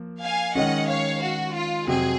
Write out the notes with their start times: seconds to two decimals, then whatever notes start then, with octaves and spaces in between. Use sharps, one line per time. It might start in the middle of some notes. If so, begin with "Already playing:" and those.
Already playing: F3 A#3
0.22 F5 G#5
0.55 D#3 G#3 C#4 D#5 F#5
0.88 C#5 F5
1.21 F#4
1.54 F4
1.87 F2 C3 F#3 C4 G#4